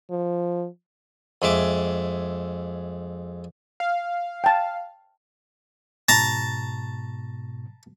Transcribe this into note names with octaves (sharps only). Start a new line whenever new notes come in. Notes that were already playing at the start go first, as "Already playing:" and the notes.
F3
F2 G#3 E5 D6
F5
G5 A5
G#2 B2 A5 A#5 C#6